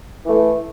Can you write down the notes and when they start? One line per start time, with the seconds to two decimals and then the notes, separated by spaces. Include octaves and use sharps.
0.25 E3 A3